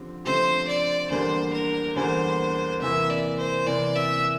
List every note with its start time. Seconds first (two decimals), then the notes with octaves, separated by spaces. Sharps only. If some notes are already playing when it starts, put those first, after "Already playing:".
Already playing: D3 F3 C4 G4
0.25 D3 F3 A3 C4 G4 C5
0.68 D5
1.10 E2 D3 G3 A#3 D4 C5
1.54 A#4
1.96 E2 D3 G3 A#3 D4 C5
2.81 C3 E3 A#3 E5
3.10 D5
3.39 C5
3.67 C3 E3 A#3 D5
3.95 E5